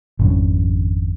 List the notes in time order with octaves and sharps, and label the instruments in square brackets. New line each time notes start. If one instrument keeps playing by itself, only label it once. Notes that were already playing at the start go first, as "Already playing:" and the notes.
[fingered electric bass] G#1 F2 C#3